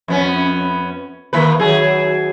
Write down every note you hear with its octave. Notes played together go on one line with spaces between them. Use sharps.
F2 B3 C#4
D#3 A#3 B4
D#3 F#3 G#4